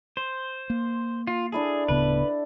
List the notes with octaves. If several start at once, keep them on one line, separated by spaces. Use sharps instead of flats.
C5
A#3
F4
D4 E4 G#4 A4
D1 C#3 B3 B4